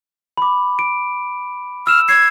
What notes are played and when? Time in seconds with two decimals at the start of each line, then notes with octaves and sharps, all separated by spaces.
0.37 B5 D6
0.79 D7
1.87 E6 F6 E7
2.09 E6 G#6 C7